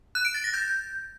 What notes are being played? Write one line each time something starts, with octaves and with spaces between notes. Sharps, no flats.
F#6
D7
A6
A#6
G6